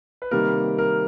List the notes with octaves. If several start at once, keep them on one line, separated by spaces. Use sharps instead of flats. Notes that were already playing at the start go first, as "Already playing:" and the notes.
B4
C3 D#3 G3 A#3 A#4
A#4